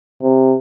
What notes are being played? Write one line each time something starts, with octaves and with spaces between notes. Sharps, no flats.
C3